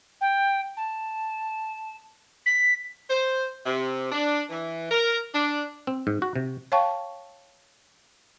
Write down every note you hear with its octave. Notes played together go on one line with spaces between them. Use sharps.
G5
A5
B6
C5
C3
D4
E3
A#4
D4
C4
G#2
F#4
C3
C#5 F5 G5 A5 C#6